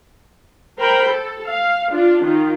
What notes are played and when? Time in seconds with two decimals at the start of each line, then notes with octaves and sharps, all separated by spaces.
0.78 A#4 C5 G5 B5
1.08 A4
1.46 F5
1.91 D4 F4
2.23 D#3 F4